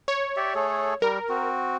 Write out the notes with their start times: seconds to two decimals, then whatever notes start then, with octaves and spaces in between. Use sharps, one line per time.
0.08 C#5
0.36 G4 D5 E5
0.55 A3 G#4 A4
1.02 G3 A#4
1.29 C4 F#4